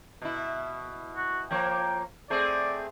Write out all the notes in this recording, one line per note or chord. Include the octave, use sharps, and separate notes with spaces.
B2 E4
F#4
F3 A#3 C#5 G5
A3 C4 G#4 D5